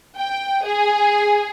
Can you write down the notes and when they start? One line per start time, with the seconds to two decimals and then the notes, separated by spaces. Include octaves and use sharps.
0.17 G5
0.66 G#4